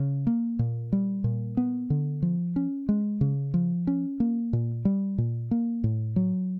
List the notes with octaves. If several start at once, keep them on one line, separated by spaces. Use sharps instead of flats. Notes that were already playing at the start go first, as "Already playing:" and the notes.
Already playing: C#3
A#3
A#2
G3
A#2
B3
D3
F3
C#4
G#3
C#3
F3
C#4
A#3
A#2
G3
A#2
A#3
A2
F#3